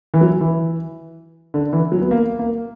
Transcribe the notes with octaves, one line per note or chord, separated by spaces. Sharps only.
E3
F#3
E3
D3
E3
F#3
B3
A#3
A#3